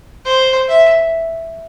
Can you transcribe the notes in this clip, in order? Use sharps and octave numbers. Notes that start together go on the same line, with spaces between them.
C5
E5